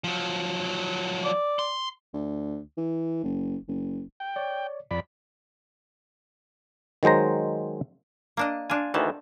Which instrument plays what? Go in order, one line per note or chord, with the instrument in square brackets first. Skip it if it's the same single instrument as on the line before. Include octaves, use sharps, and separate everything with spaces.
[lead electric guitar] F3 F#3
[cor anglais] D5
[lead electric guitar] C6
[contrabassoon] D2
E3
F#1
F#1
[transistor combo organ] G5
[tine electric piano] C#5 D5
[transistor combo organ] F2 D5 B5
[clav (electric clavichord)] D#3 F#3 G#3 C5 A#5
[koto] A#3 D4 D#5
[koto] D4 F4 [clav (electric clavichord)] G#5
[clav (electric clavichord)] D2 D#3 E3 [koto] A5